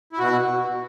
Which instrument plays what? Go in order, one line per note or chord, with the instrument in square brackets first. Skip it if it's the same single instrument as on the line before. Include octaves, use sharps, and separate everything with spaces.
[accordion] E4
B2 F#4